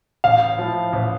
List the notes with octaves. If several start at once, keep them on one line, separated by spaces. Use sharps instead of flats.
A1 F5
A2 F3
A1